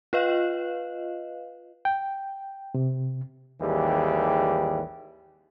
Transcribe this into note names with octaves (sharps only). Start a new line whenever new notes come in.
F4 B4 D#5 F5
G5
C3
G#1 D#2 E3 G3 G4 G#4